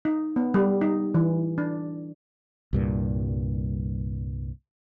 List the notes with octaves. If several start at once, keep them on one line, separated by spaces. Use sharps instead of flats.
D#4
B3
G3
D#4
E3
D4
C2 G2 A#2